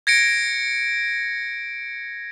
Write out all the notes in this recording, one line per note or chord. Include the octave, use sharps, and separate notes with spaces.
G#6 A#6 C#7 D7